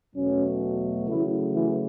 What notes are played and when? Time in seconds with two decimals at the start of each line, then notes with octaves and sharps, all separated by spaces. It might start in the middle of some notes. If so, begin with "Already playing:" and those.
0.15 E2 B2 F#3 A3 C#4
1.07 C#3 E3 F#3 A3 E4
1.53 E3 E4